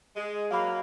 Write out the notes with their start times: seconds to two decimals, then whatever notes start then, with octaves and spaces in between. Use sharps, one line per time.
0.16 G#3
0.51 F#3 A#3 F5 B5